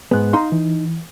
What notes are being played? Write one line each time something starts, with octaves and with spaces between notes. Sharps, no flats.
G#2 B3 G#4 F#6
D#4 F5 A#5 C6
E3